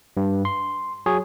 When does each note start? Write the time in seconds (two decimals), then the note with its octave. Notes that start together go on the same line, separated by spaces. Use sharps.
0.17 G2
0.45 C6
1.06 F#3 G#4 C#5